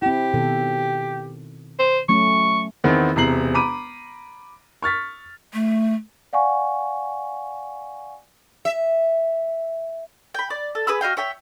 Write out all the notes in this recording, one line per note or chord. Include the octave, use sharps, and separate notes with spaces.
C4 E4 G4
B2 D#3 A4
C5
F#3 A3 C#4 C#6
E2 D#3 B3 C4 E4
E1 C3 A#5 C7 F#7
A#5 B5 D6 D#7
C#6 F6 A6 B6
A3
D5 F5 F#5 G#5 C#6
E5
G5 B5
D5
A4
G#4 B4 B5 E6
F#4 D#5 F5 G5
C#5 E5 G5